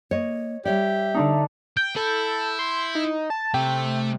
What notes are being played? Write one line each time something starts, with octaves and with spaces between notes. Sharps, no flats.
A#3 C#5 D#5
G3 G4 C#5 D5 E5
D3 D4 D#4
G5 G6
E4 A4
C6
D#4
A5
C3 A3 E5 G5